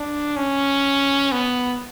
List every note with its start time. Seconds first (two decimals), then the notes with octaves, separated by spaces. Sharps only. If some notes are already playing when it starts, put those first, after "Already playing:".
Already playing: D4
0.36 C#4
1.32 B3